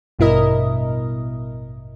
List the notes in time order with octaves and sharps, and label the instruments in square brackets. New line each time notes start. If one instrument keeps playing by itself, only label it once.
[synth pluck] A1 G2 B2 E4 A#4 D#5